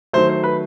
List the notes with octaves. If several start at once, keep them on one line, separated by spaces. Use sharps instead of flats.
D#3 F#3 A3 C5
C5
B4